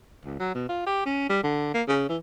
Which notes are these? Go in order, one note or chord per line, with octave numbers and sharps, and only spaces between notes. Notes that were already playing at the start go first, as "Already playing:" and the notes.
C#2
F#3
B2
F4
G4
C#4
G3
D3
A#3
C#3
E3